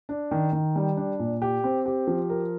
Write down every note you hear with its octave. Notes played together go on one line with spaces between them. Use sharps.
D4
D#3
D#3
G3
D4
A#2
G4
C4
G4
F3
A#4